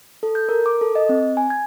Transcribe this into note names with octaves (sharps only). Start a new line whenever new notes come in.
A4
G6
A#4
D6
A4
D#5
C4
G#5
G#6